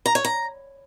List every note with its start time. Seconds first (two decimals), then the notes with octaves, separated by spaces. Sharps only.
0.06 A#5
0.15 C#5
0.25 A#5